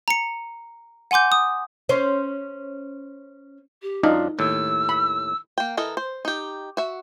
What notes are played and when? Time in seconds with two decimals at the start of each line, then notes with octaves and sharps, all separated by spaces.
0.08 A#5 C#7
1.11 F#5 G#5 C6 D6 G6
1.32 D#6
1.89 C#4 C5
3.82 G4
4.03 F#2 D4 D#4 F4 F5
4.39 D#2 A2 E6
4.89 B5
5.58 A#3 G5
5.77 E3 A4 A#4 D#5
5.97 C5
6.25 D#4 G4
6.77 F#4 E5